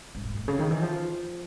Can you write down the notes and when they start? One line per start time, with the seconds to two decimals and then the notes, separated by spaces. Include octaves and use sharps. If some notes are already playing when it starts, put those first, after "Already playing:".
0.15 G#2
0.25 A2
0.36 A2
0.48 C#3
0.59 D#3
0.71 E3
0.82 F3